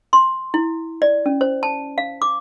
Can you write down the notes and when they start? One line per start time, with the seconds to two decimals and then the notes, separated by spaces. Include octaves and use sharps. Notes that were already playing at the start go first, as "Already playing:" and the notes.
0.13 C6
0.54 E4
1.02 D5
1.26 C#4
1.41 C5
1.63 A5
1.98 F5
2.22 D6